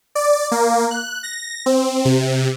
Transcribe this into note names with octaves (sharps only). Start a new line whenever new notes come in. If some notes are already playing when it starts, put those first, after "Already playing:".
D5
A#3
F#6
A#6
C4
C3